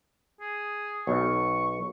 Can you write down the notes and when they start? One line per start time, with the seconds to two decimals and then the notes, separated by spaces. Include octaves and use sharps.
0.41 G#4
1.07 B1 C#6